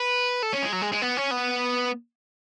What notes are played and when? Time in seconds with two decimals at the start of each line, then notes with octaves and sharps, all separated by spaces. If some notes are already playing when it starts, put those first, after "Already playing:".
Already playing: B4
0.42 A4
0.53 C#4
0.63 G#3
0.73 F#3
0.82 G#3
0.92 G#3
1.02 B3
1.17 C#4
1.31 B3